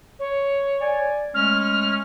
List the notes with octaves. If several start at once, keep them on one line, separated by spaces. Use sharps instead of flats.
C#5
D5 G#5
G#3 A3 C#4 F6